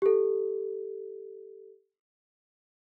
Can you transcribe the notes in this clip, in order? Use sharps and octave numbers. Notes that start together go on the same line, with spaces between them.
G4 A4